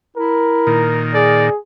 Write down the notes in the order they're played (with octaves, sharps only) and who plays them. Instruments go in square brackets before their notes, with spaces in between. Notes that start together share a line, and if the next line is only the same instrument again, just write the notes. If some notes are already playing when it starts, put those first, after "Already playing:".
[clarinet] E4 [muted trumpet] A#4
[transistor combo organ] A#2 D#3
[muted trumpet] G#4 [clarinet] D5